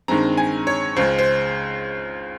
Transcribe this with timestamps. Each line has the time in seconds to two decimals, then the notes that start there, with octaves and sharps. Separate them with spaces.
0.08 G2 D#3 G#3 C4 A#5
0.38 G#5
0.67 C#5
0.96 C#2 C#3 G#3 C5
1.19 C5